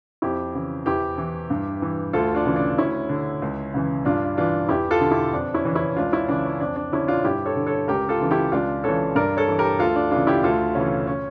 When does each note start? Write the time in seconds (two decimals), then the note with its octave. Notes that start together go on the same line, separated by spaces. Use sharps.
0.22 F2 E4 G4
0.54 C#3 E3
0.86 E2 E4 G4
1.18 E3
1.50 G2
1.82 E3
2.13 D2 F4 A4
2.35 D4 F4
2.45 C#3 E3
2.56 D4
2.77 D2 C#4 E4
3.09 D3
3.42 C#2
3.74 C#3 E3
4.05 G2 D4 F4
4.37 E3 D4 F4
4.69 E2 E4 G4
4.91 F4 A4
5.01 D3
5.11 E4 G4
5.33 F2 D4
5.54 C#4 E4
5.65 C#3 E3
5.75 C#4 E4
5.96 C#2 D4 F4
6.12 C#4 E4
6.29 C#3 E3 D4
6.45 C#4
6.60 F2 D4
6.76 D4
6.92 D3 C#4 E4
7.08 D4 F4
7.25 G2 E4 G4
7.46 A4 C#5
7.56 D3
7.67 A4 C#5
7.88 C#2 G4 A#4
8.09 F4 A4
8.20 C#3 E3
8.31 E4 G4
8.52 C#2 D4 F4
8.84 C#3 E3 A4 C#5
9.15 G2 A#4 D5
9.37 A4 C#5
9.48 E3
9.58 G4 A#4
9.79 D2 F4 A4
9.96 D4
10.11 C#3 E3 D4 F4
10.27 E4 G4
10.43 D2 F4 A4
10.75 C#3 E3 C#4
11.07 C#4